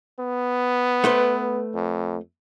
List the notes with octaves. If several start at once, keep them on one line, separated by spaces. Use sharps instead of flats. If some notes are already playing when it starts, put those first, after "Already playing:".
B3
A3 B4 C5
F2